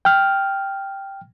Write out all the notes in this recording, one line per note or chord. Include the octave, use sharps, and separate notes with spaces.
G5 F6